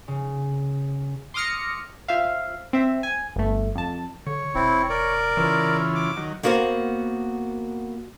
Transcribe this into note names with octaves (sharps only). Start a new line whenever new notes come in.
C#3
C6 D6 D#6 F6 A#6 C#7
F4 C5 E5 F5
C4 E5
G#5
G1 A3
F2 A5
D3 C#5
E1 C4 E4
A#4 D5
C#3 E3 E4 F4
D6
D#3 F#3
A#3 B3 F#4 A#4 C5 C#5